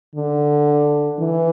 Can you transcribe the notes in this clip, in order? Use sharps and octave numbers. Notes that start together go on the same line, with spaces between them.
D3
E3